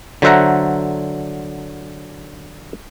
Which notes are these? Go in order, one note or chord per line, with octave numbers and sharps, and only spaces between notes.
D3 F#3 C5 E5 F#5 A#5